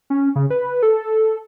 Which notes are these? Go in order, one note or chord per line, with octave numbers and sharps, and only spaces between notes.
C#4
C#3
B4
A4